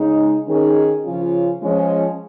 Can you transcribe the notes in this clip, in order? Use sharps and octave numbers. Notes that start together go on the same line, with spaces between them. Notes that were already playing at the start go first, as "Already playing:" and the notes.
Already playing: C#3 G#3 D#4
D#3 C#4 G#4
C#3 F3 C#4 F4
F3 G#3 C#4